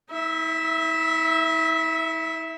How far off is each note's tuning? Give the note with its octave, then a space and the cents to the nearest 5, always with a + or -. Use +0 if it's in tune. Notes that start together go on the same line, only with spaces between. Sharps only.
E4 -40 E5 +0